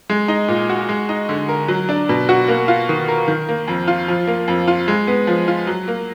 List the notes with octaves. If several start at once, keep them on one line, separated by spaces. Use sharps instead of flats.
G#3
D#4
A#2
F#4
G#3
D#4
D3
A#4
F#3
D4
B2
F#4
A#3
F4
D#3
A#4
D#3
A#3
F2
F4
F3
A#3
F2
F4
G#3
B3
F3
F4
F#3
A#3